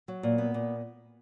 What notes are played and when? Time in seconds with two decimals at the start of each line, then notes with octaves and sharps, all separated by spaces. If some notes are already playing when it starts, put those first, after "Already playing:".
0.08 F#3
0.23 A#2
0.38 B3
0.54 A#2